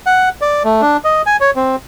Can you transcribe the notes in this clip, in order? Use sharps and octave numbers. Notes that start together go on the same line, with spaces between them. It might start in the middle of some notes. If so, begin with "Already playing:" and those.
F#5
D5
A3
D4
D#5
G#5
C#5
C4